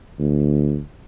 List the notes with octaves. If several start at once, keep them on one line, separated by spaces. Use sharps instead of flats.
D2